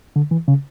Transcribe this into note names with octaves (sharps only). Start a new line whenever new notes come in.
D3
E3
C#3